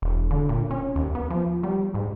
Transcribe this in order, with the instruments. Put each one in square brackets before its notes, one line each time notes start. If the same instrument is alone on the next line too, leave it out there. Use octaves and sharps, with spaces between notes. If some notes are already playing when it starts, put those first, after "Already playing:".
[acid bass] E1
D3
A#2
C#4
D#2
B3
F3
G3
G#2